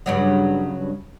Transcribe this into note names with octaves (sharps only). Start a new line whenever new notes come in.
G2 C#3 F#3